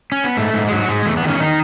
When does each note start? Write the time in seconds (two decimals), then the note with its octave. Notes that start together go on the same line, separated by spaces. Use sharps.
0.12 C#4
0.24 B3
0.37 G#2 A3
0.54 G#2
0.67 G#3
0.71 G#2 F#3
0.89 G#2 G#3
1.06 E2 A3
1.17 B3
1.23 D#3
1.28 C#4
1.40 D#3 D#4